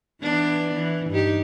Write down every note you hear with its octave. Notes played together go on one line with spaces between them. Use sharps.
E3 B3 D4
E3
G2 D#4 G4